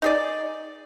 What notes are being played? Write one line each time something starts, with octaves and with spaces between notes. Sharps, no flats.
D#4 G#4 D5